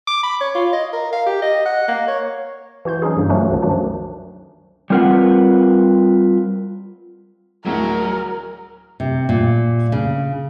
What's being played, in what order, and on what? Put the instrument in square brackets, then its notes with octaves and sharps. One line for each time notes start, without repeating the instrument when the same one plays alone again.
[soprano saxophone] D6
B5
C#5
F4
D#5
A#4
F5
G4
D#5
F#5
A#3
C#5
[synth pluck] E3 F#4 C5 G6
F#3 C#4 D#4 G#4
G2 B2 D3 E3 A#3
D3 F3 F#3 A3 C#4 D4
C2 F#2 B2 D3 D#3 F3
D#3 F#3 A3 C#4 D4
[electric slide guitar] G3 C4 F4 A#4 B4 F#5
[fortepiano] D2 A2 G#3 [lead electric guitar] F#3 [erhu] A#4
[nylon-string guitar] C3
A#2
C#3